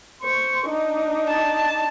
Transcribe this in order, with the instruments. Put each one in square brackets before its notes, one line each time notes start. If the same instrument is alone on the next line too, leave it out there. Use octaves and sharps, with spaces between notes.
[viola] C5 C#6
D4 D#4
[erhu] A5